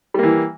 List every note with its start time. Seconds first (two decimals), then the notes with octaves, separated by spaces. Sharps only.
0.14 G3
0.19 A#3
0.23 E3